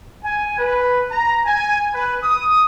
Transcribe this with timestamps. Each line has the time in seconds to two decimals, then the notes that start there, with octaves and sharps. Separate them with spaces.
0.24 G#5
0.59 B4
1.12 A#5
1.46 G#5
1.94 B4
2.23 D#6